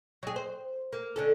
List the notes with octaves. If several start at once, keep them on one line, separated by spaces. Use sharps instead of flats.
F#3 G#4
C5
A#3
D3 C#4 A4